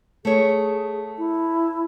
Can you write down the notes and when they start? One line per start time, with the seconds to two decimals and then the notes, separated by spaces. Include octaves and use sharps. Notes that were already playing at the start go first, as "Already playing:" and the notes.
0.25 A3 G#4 C#5
1.18 E4